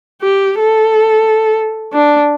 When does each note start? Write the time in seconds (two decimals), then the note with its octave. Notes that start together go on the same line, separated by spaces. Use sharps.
0.22 G4
0.59 A4
1.93 D4